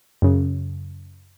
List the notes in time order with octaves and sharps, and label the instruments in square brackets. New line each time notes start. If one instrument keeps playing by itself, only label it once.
[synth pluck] F#2 C#3